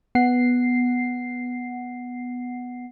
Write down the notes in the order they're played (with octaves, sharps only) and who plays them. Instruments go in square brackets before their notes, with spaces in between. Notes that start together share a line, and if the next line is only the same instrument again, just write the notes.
[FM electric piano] B3 F#5 C7